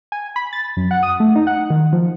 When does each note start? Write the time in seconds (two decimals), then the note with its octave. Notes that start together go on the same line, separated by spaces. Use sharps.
0.12 G#5
0.36 B5
0.53 A6
0.77 F#2
0.91 F#5
1.03 D#6
1.20 A3
1.35 D#4
1.47 F#5
1.70 D#3
1.93 F3